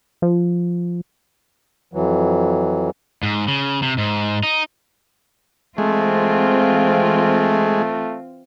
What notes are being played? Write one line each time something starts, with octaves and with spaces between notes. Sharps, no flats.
F3
F2 E3 F#3
G#2
C#3
C3
G#2
D#4
E3 G#3 A3 C4 F4